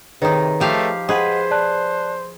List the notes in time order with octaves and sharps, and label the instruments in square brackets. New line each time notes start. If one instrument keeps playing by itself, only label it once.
[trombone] C3 [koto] D#3 D#4 [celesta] G#4 B4 C#5
[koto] F3 G4 F5 [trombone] A3
[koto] G#4 B4 [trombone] C5 [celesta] D#5 F#5
[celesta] D5 A5 F#6